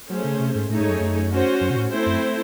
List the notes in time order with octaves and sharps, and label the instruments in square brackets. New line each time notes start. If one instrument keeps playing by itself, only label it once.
[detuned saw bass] F#3 [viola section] A3 C#4 G#4 C5
[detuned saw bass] C#3
C3
G#2
[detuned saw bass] A2 [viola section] A3 D#4 G#4 C#5
[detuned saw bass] G#2
F#2
F#2
[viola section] C#4 F#4 C5
[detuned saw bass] F#2
C3
A2
[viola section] A3 C4 E4 C5
[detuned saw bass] F#2